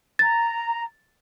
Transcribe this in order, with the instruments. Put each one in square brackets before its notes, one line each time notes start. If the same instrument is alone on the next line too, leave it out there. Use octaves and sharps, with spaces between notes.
[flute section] A#5 [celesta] A6